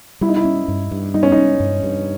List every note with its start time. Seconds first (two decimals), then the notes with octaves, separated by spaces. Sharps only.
0.21 G3 E4
0.29 D#4
0.36 E4
0.45 C#4
0.68 G2
0.91 G2
1.14 G3 D#4
1.23 C#4
1.32 D#4
1.37 C#4
1.60 G2
1.83 G2